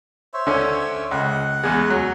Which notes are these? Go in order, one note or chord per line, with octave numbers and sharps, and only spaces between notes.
C5 C#5 E5
D3 C#4
C#2 F#5
E2 G#3
F#3